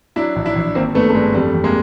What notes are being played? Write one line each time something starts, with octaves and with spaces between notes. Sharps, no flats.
F#3 D4 E4
A#1
D4 E4
A#1
G#1 A#3 C4
G2 A3 B3
A3
G2 G#3
F2 G3 A3
F2
G#3 A#3